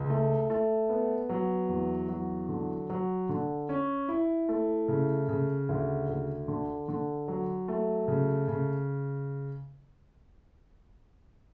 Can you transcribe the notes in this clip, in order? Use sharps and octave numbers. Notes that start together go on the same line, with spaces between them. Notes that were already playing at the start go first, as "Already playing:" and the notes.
Already playing: C#2
A3
A3
B3
F#3
E2
F#3
D3
F#3
D3
C#4
E4
A3
C#3
C#3
D2
D2
D3
D3
F#3
A3
C#3
C#3